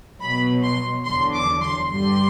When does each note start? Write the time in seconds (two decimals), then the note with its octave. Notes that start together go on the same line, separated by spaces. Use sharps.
0.20 B2 F#3 B5
0.62 C6
1.05 E2 D3 F#3 C6
1.33 D6
1.62 C6
1.90 G2 D3 G3 C6